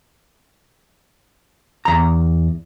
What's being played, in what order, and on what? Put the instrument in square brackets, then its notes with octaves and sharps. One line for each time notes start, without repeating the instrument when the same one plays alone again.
[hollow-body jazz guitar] E2 A#5